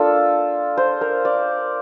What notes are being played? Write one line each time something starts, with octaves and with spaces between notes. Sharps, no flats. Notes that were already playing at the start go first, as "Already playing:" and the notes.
Already playing: A#3 D4 F4 A4
C5
A#4
D5